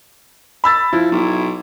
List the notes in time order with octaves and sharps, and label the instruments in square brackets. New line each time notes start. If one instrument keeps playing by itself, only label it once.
[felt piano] B5 E6 A6
[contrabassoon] F3 [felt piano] E4
[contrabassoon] B1